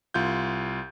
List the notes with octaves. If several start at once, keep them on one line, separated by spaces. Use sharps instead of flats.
C2 F4 G6